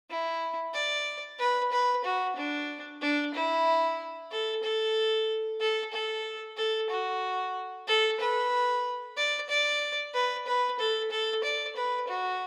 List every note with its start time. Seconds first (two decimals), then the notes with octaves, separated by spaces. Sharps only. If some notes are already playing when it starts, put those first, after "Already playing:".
0.10 E4
0.74 D5
1.39 B4
1.72 B4
2.04 F#4
2.36 D4
3.01 D4
3.34 E4
4.31 A4
4.63 A4
5.60 A4
5.93 A4
6.57 A4
6.90 F#4
7.87 A4
8.20 B4
9.17 D5
9.49 D5
10.14 B4
10.46 B4
10.79 A4
11.11 A4
11.44 D5
11.76 B4
12.08 F#4